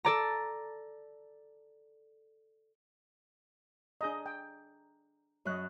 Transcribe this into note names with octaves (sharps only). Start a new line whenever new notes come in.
A4 D5 A#5
D4 G#4 D#5 A#5 G6
G5
F#2 F#3 C#5 D#5 F#6